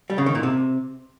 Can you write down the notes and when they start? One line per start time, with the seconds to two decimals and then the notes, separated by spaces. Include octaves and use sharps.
0.10 G3
0.18 C#3
0.26 D#3
0.35 A#2
0.43 C3